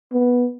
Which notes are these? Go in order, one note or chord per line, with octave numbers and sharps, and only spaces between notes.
B3